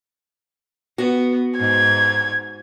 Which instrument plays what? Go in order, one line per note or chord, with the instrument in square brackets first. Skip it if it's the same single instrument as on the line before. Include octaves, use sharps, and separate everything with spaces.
[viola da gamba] B3 [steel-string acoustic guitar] F#4
[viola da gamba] G#2 [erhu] G#6